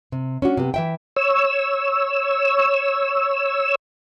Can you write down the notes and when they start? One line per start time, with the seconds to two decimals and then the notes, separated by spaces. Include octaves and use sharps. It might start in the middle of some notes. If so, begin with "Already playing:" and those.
0.12 C3
0.42 C#4 D4 F#4
0.57 C3 B3
0.74 E3 E5 G5
1.16 C#5 E6